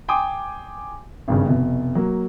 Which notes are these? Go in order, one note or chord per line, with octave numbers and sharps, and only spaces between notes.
G5 G#5 C6 D6 D#6
G#1 G2 C#3
F1 B2
F#3 A#3